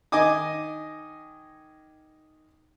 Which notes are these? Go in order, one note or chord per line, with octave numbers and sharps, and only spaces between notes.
D#3 D#5 G#5 D6 D#6